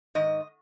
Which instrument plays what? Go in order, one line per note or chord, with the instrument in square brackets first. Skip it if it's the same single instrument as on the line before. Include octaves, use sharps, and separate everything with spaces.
[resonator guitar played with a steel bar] G#2 D#3 D#5